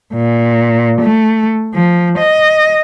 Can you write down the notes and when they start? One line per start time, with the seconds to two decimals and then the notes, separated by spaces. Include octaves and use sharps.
0.13 A#2
1.01 A3
1.74 F3
2.18 D#5